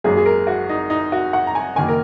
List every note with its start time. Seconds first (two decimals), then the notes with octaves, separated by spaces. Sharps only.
0.04 G#1 F#2 F#3 A#3 G#4
0.17 G#4
0.26 A#4
0.47 F#4
0.69 D#4
0.90 D#4
1.12 F#4
1.33 F#5
1.47 A#5
1.55 G#5
1.76 F#1 F#2 D#3 A#3 G#5
1.88 A#4